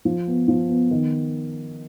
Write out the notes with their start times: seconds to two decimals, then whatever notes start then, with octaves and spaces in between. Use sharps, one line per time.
0.05 F3
0.27 B3
0.48 F3
0.69 B3
0.91 D#3